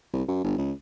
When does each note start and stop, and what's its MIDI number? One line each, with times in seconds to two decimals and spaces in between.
0.13 0.23 36
0.28 0.40 42
0.44 0.57 31
0.58 0.72 37